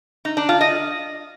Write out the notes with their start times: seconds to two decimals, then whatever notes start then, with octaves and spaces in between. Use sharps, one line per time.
0.25 D#4
0.37 D4
0.49 F4
0.61 D#5